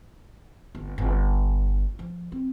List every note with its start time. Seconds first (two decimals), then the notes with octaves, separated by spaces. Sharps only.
0.75 G1
0.98 G1
1.99 F3
2.32 C4